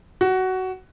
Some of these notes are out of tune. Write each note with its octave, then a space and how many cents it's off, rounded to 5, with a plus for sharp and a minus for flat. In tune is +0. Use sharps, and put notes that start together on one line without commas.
F#4 +15